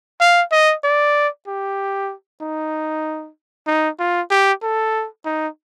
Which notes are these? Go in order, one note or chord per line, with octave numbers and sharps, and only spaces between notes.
F5
D#5
D5
G4
D#4
D#4
F4
G4
A4
D#4